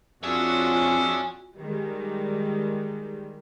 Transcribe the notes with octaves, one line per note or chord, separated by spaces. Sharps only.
F2 D4 F4 F#4 G#4 C#5 E5 G#5
D#3 G3 G#3